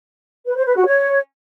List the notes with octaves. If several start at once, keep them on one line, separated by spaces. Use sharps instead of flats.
B4
C5
B4
F#4
C#5